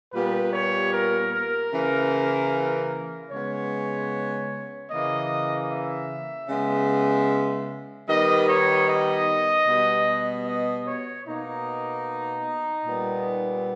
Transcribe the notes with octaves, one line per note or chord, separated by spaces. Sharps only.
A#2 G3 B3 B4
C#5
A#4
A#4
C#3 E3 A#3
C#3 G#3 B3 C#5
C#3 E3 A#3 D#5
E5
C#3 G#3 B3
D#3 G3 B3 D#5
C#5
D#5
B2 G3 B3
D#5
C#5
B2 A#3 D#4
A#2 G3 B3